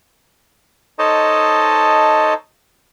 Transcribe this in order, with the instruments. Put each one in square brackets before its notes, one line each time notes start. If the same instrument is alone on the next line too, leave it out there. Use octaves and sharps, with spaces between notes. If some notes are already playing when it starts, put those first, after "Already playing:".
[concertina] D#4 A4 C5 C#5 D#5 A5